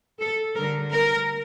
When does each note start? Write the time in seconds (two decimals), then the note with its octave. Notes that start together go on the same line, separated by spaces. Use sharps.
0.20 A4
0.56 D3 G3 A#4
0.92 A#4